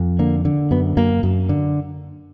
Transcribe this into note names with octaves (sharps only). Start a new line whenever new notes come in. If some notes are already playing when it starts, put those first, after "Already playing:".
Already playing: F2
D3 A#3
D3
F#2 B3
F#2 A#3
F#2
D3